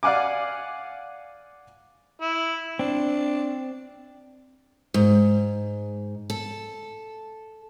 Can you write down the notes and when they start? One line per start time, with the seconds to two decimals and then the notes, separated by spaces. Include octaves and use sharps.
0.03 D5 F5 F#5 G#5 D6
2.22 E4
2.79 C4 D4
4.94 G#2
6.30 A4